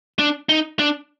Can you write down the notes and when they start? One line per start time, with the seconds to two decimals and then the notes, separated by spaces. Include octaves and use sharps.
0.19 D4
0.49 D#4
0.79 D4